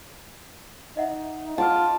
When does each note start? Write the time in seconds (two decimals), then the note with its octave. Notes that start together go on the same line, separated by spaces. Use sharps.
0.97 D#4 D#5 E5 F#5
1.58 F4 D#5 F#5 A5 D6 F6